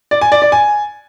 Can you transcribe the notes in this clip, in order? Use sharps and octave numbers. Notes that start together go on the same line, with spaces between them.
D5
G#5
D5
D5
G#5